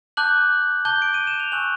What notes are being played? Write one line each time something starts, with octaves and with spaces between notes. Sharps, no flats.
A5 D6 F#6 G6 F#7
A5 D6 G6 G7
D7
D#7
E7
F7
G#5 C#6 E6 F#6 F#7